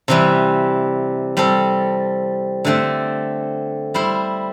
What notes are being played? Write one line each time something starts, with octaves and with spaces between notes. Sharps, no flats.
C3 E3 G3
G3 C4 A4
D3 A3 C4 A4
G3 E4 C5